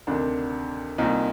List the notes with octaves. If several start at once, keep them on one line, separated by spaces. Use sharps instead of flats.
D2 C3 D#3 D4
C2 A#2 D#4